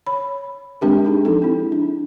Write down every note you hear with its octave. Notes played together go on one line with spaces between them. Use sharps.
C#5 B5
G#3 C4 D4 G4 A#4
C4 D#4 G#4
F3 D#4 A4
C4 E4
D4